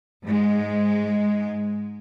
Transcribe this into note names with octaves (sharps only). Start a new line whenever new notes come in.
G#2 G#3